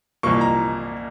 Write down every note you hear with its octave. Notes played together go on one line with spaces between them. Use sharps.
C2 A#2 F3 A#3 C#6
A#5